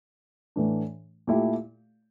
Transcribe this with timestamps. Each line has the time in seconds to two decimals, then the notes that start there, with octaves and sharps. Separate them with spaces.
0.56 A2 E3 A3 D4
1.27 A#2 A3 E4 G4